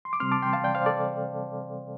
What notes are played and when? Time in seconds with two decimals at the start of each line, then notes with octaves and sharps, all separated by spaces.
0.05 C6
0.13 D6
0.20 C3 G3 C4 C6 F6
0.31 A5 D6
0.42 G5 C6
0.53 F5 A5
0.64 D5 G5
0.75 C5 F5
0.86 A4 D5